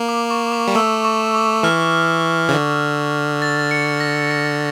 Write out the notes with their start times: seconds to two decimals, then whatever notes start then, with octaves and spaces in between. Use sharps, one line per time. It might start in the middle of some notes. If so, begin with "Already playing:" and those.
Already playing: A#3
0.09 D6
0.31 C#6
0.52 D6
0.68 G3
0.75 A3 E6
1.05 C#6
1.35 D6
1.63 E3 F6
2.49 C#3
2.53 D3
3.42 A6
3.71 C#7
4.00 A#6
4.31 C#7